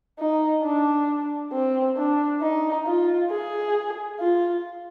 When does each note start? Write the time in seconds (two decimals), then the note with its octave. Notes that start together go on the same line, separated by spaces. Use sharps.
0.19 D#4
0.63 D4
1.52 C4
1.97 D4
2.42 D#4
2.86 F4
3.30 G#4
4.20 F4